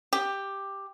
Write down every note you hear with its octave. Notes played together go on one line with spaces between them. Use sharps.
G4